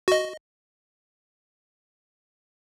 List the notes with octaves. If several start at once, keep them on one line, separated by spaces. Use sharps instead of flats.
F#4 D#5